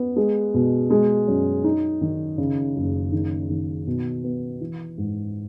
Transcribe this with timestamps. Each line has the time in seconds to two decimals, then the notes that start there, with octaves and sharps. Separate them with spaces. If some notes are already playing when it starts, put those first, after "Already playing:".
Already playing: B3
0.16 G#3
0.54 B2
0.90 G#3
1.27 F#2
1.64 D#4
2.01 D#3
2.38 C#3
2.76 F#1
3.12 D#3
3.50 D#3
3.87 B2
4.24 B3
4.61 E3
4.98 G#2